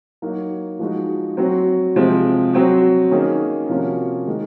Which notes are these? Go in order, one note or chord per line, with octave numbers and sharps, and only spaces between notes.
F#3 A#3 D#4 F#4
F3 G#3 D#4 F#4
F#3 C4 F#4
C3 F3 G#3 C4
F#3 C4 F#4
D#3 A#3 C#4 G#4
C3 F3 A#3 C#4 F#4
D#3 G#3 D#4